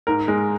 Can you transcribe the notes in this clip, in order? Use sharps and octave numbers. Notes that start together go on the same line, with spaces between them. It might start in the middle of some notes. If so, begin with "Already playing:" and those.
G#2 A#4
G#3